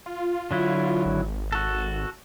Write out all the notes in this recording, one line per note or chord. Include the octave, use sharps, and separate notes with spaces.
F4
D3 F#3 E4
G#1
F#4 A4